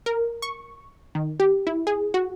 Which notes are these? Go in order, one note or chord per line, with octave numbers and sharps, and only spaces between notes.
A#4
C#6
D#3
G4
E4
G#4
F#4